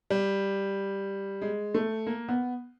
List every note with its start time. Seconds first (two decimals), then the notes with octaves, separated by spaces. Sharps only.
0.10 G3
1.42 G#3
1.74 A3
2.07 A#3
2.29 B3